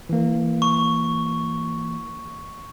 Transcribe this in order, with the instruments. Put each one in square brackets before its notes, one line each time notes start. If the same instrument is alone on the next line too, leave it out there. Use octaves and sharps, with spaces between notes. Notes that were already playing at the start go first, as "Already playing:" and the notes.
[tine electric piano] E3 A#3
[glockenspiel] C#6